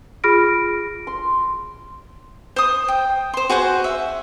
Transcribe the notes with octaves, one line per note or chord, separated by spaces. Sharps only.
F4 G#4 B5 F6 A#6 D7
C6
C5 D#6
G5
C5 C6
F#4 G#4 C5 F#5
E5